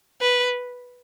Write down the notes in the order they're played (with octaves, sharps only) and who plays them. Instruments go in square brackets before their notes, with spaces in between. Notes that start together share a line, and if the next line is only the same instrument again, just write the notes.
[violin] B4